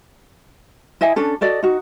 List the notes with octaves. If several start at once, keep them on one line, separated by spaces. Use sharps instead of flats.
E4 D#5 E5 G#5
C#4 D4 A4
F#4 A4 D5 D#5
D#4 F#4